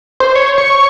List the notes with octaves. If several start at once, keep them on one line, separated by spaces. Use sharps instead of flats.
C5
C#5
C#6
C#6